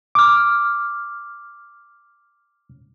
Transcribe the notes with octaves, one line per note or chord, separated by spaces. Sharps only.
D6 F6